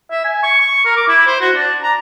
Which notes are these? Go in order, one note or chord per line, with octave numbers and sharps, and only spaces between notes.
E5
G#5
C#6
C#6
A#4
D6
E4
C5
F#4
D4
A#5